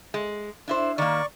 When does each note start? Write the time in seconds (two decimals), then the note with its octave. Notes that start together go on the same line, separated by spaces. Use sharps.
0.14 G#3
0.68 D4 E4 C5
0.98 D#3 A#3 D5 C#6